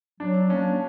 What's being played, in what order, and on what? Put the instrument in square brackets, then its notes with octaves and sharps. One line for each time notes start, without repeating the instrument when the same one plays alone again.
[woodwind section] F#3 [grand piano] D4
[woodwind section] A#3 D4 [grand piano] C#4